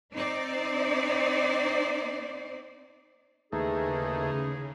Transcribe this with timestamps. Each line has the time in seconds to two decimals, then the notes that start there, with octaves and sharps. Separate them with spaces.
0.14 C4 D#4 C5 D5
3.52 D#2 C#3 E3 A3 D#4 G#4